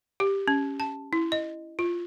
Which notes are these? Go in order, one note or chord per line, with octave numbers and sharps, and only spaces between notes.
G4
C#4
A5
E4
D#5
F4